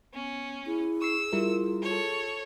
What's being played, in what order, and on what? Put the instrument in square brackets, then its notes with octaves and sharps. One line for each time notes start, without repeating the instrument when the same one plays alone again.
[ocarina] B3 [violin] C#4
[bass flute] E4 [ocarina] G#4
[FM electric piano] C#6 C7 [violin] E6
[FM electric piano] G3 E4 A#4 [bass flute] F4
[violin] A4 C#5